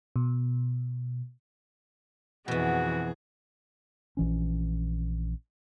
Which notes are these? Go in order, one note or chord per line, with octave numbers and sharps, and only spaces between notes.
B2
F2 B2 E3 B3 F#4 G#4
A#1 E3 C#4